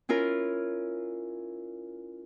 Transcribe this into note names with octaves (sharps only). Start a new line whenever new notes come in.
C#4 E4 F4 A#4